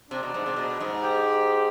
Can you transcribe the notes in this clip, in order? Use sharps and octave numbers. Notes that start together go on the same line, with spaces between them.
C3 D4
B2
G#2
C3
B2
G#2
G4